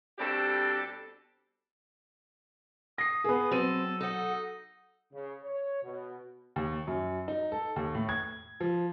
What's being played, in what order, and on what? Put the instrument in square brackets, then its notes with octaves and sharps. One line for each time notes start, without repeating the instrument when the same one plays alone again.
[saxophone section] B2 G3 C4 D4 G4 A4
[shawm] D#6 [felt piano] A#6 C7
[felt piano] B3 G#4
[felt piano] F#3 D#7 [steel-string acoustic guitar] C4 [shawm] A4
[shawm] D#4 [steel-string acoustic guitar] A4 F#5
[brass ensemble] C#3
C#5
B2
[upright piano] D#2
F#2
D#4
A4
D#2
A2
G#6
F3